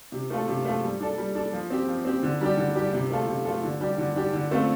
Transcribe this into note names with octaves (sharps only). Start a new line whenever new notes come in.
C3
A3 F4 A4
C3
A3 F4 A4
G3
D4 A4
G3
D4 A4
F3
C4 G4
F3
C4 G4
D3
G3 D4 G4
D3
G3 D4 G4
C3
A3 F4 A4
C3
A3 F4 A4
D3
G3 D4 G4
D3
G3 D4 G4
D3
A3 C4 F4